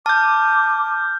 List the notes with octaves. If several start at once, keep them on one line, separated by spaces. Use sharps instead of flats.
A5 D6 F6 G6